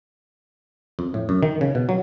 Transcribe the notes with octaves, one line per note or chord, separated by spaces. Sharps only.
F2
A2
F#2
D#3
C#3
B2
F#3